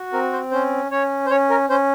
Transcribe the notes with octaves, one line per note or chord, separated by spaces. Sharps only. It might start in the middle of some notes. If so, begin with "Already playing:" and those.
Already playing: F#4
C4 A#4
C5
C#4 C5
C#4 C#5
C5
C#4 C#5
A#4
C#4 C5